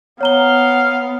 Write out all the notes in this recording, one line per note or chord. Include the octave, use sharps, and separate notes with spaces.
B3 C#5 F5 A#5 G7